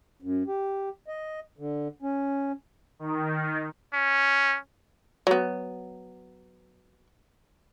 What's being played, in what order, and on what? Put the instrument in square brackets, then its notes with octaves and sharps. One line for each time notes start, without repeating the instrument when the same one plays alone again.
[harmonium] F#2
G4
D#5
D3
C#4
[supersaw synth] D#3
[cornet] C#4
[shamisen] F#3 B3